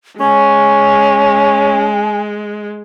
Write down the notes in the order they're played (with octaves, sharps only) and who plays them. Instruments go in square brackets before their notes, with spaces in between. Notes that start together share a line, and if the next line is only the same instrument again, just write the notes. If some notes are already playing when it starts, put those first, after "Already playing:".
[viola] G#3 [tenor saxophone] C#4 [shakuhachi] G#5